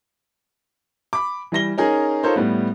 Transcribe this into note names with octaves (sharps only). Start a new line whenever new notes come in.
B5 D6
E3 G3 A#6 G7
C#4 D#4 G#4 A#4
D#4 F4 A4 A#4 C5 C#5
A2 G3 B3